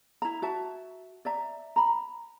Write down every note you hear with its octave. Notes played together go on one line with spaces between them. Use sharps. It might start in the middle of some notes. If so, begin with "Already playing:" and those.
E4 A#5
F#4 E5 A5
D5 E5 A#5
A#5 B5